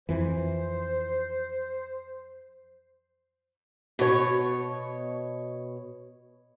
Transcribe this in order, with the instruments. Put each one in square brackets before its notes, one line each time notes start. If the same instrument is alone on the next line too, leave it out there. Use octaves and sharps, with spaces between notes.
[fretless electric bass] F2 E3 [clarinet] C5
[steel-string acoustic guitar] B2 C#5